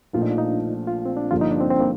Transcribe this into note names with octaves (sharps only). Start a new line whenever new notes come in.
A#1 A#2 F3 A3 F4
D#4
D4
D#4
F4
C4
D4
G1 G2 F3 A#3 F4
D#4
D4
C4
C4
A#3